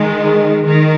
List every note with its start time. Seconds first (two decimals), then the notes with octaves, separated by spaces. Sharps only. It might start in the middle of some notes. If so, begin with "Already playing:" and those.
Already playing: D#3 G#3
0.67 D#3